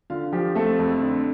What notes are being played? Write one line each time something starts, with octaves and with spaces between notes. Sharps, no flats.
D3 F4 F5
F3 G4
A3 C4 A4
F2
D3